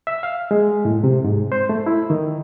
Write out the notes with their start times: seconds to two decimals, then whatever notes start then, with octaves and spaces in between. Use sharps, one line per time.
0.07 E5
0.23 F5
0.51 G#3
0.85 A2
1.04 C3
1.24 G#2
1.52 C5
1.69 A3
1.86 E4
2.10 D#3